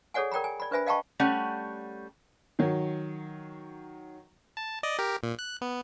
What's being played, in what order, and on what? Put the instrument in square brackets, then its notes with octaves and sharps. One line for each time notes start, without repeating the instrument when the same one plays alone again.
[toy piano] G#4 A4 C#5 D5 F#5 G#5
A#4 D5 G5 A#5 B5
G#5
D5 B5
D4 B4 C5 E5 G#5 B5
D#5 F5 G5 A5 B5 C#6
[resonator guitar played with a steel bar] G3 A3 C#4 F#5
[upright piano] D#3 F#3
[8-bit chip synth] A5
D5 D#5
G4 A#4
A#2
F#6
B3